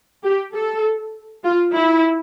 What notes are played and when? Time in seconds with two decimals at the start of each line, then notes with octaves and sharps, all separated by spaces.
0.24 G4
0.54 A4
1.44 F4
1.73 E4